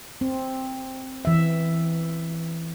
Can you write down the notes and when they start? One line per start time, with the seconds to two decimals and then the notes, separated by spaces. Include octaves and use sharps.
0.21 C4
1.25 E3 E5